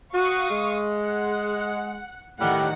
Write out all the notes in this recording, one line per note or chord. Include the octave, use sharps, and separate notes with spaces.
F#4 F5 C#6 D#6
G#3
F#5
A2 D#3 G3 F#5